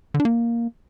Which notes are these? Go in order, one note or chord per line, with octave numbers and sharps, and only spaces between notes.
D3
D4
A#3